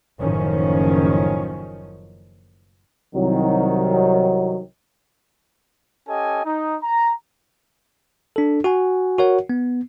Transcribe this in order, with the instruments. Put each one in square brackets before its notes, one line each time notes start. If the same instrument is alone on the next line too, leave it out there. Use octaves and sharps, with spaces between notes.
[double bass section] F#1 A2 D#3 F3 C#4
[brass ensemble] C2 D#3 F#3
[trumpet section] C#4 G4 A4 D#5 G#5
D#4
A#5
[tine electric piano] D4 A4
F#4 F#5 G#5
F#4 A#4 C#5 F#5
B3